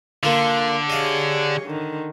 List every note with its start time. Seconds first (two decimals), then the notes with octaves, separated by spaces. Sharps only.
0.23 D3 A#3 F4
0.90 G4 G#4 C#5 D#5 F5
1.66 D3 D#3